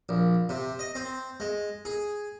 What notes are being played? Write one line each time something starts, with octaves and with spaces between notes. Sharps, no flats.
A#1
C3
D#5
C4
G#3
G#4